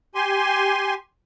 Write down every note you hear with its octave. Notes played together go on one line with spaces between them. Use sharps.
G4 G#5 C6